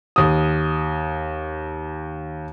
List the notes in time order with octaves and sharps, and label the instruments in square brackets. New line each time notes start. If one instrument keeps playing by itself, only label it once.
[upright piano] D#2 D#6